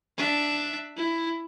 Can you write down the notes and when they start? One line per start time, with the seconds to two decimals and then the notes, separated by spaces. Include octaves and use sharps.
0.18 D4 E5
0.97 E4